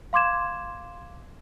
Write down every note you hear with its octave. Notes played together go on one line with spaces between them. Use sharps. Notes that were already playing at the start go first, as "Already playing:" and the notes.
F5 C6 D6 G#6 E7